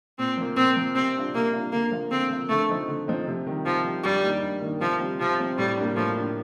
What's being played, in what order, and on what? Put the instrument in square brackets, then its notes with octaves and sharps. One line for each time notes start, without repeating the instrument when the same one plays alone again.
[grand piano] A#2 [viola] C4
[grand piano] F3 A#3
[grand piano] A#2 [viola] C4
[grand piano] F3 A#3
[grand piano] C3 [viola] C4
[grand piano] G3 D4 F4
[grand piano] C3 [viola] A#3
[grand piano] G3 D4 F4
[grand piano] D3 [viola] A#3
[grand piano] F3 A#3 F4
[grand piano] D3 [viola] C4
[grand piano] F3 A#3 F4
[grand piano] D3 [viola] A3
[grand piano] F3 C4 D#4
D3
F3 C4 D#4
C3
D#3 G3
[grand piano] C3 [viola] F3
[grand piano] D#3 G3
[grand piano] G2 [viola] G3
[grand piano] D#3 A#3 D#4
G2
D#3 A#3 D#4
[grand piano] C3 [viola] F3
[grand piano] G3 C4
[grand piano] C3 [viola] F3
[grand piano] G3 C4
[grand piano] A2 [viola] G3
[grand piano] G3 A#3 D4
[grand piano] A2 [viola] F3
[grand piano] G3 A#3 D4